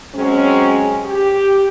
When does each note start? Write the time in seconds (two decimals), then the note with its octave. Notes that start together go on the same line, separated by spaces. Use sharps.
0.15 F#3 G#3 C4 C#4
1.06 G4